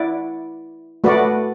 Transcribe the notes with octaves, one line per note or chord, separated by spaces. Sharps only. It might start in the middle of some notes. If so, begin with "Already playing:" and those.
Already playing: E4 D5 F#5
A3 F#4 B4 D5 F#5